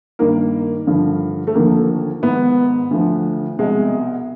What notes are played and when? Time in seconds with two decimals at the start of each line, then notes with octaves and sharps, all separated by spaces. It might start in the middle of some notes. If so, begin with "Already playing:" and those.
0.19 G2 D#3 A#3
0.87 G2 D3 F3
1.47 A3
1.55 D#2 D3 F3 A#3
2.23 G#2 D#3 B3
2.91 D2 D3 F3
3.58 C2 B2 G#3